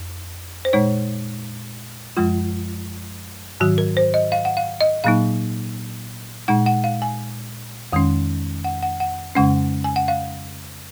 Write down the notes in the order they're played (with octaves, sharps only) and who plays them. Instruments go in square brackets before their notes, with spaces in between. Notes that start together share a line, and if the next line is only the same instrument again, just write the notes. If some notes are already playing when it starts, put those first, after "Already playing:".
Already playing: [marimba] F2
C5
A#2 G#3 D#4 C#5
F#2 F3 G#3 F4
G#2 D#3 F#3 F#4
A#4
C5
D#5
F5
F#5
F5
D#5
A#2 F#3 A#3 D#4 F5
A#2 G#3 D#4 F#5
F#5
F5
G#5
F2 D#3 G#3 C#4
F#5
F#5
F#5
F2 C#3 G#3 C#4 F#5
G#5
F#5
F5